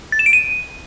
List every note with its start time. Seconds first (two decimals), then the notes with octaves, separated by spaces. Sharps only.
0.12 A6
0.19 E7
0.26 D7
0.33 D#7